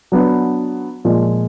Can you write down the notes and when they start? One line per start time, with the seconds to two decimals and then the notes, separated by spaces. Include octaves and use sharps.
0.12 F#3 B3 D4
1.05 A#2 F3 G#3